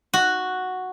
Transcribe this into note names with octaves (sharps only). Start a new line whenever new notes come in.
F#4